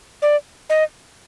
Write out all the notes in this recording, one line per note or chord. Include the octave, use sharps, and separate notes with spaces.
D5
D#5